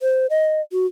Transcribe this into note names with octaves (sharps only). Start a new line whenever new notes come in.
C5
D#5
F#4